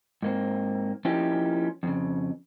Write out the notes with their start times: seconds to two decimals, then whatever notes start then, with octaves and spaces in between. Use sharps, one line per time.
0.23 G#2 A#3 C4
1.05 F3 A#3 C#4 D#4 E4 G4
1.83 F2 C#3